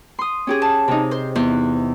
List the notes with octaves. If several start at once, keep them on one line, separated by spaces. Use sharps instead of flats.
C6 D#6
C#4 G4 G#4
A5
C3 D#4
C5
E2 C5 F#6